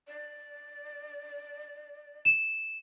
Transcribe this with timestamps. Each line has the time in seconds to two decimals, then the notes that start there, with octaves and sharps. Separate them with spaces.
0.08 D5
2.25 E7